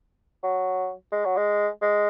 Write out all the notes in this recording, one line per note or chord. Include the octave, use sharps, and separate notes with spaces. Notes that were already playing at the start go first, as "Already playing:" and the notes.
F#3
G#3
F#3
G#3
G#3